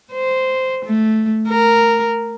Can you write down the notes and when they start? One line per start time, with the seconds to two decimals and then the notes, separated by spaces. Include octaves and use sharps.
0.12 C5
0.85 A3
1.49 A#4